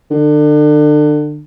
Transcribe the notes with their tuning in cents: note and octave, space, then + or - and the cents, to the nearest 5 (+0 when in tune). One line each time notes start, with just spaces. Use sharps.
D3 +30